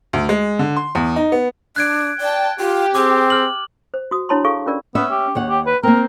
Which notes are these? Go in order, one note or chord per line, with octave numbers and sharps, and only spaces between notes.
D2
G#3
D3
C6
E2
D#4
B3
D4 F#6 G#6 D7
D5 G5 A5
F4 G4
C4 G#4 D6
F6 F#7
C5
F#4 D#6
D4 E4 C#5 A5 B5 C6
G#4 A4 F5 C#6
C#4 F4 A#4 D5
B3 C#4 E5
G4
D#2 C#5 F#5
G4
B4
A#3 C4 A#4